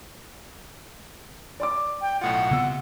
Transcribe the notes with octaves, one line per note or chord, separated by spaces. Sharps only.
D5 C6 D6
G5
B1 A2 F4 F#5
C2 C#3 B3 E6